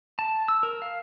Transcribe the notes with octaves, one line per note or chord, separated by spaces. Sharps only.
A5
E6
A#4
F5